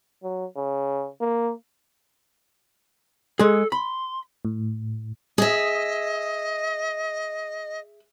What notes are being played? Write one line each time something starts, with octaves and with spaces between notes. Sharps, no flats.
F#3
C#3
A#3
G#3 G#4 A4
B5 C6
A2
G#4 D#5 E5